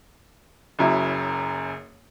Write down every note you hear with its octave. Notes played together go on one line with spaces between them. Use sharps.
F#1 F#2 E4